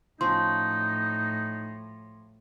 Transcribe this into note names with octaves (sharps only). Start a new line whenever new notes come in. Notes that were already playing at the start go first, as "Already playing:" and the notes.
A2 F3 C#4 D#4 C6